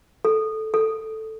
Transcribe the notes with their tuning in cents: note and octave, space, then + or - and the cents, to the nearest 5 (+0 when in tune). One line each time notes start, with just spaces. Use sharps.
A4 -10
A4 +0